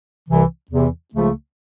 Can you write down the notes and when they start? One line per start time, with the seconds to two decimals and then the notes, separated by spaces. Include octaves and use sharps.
0.28 C2 C3 E3
0.71 E2 C3 E3
1.14 C#2 C#3 F3 A3